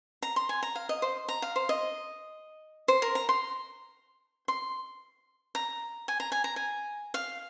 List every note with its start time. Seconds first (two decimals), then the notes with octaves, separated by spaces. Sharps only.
0.22 A#5
0.36 C6
0.49 G#5
0.63 A#5
0.76 F5
0.89 D#5
1.02 C5
1.29 A#5
1.42 F5
1.56 C5
1.69 D#5
2.88 C5
3.02 A#4
3.15 A#5
3.29 C6
4.48 C6
5.55 A#5
6.08 G#5
6.20 A#5
6.32 G#5
6.44 A#5
6.56 G#5
7.14 F5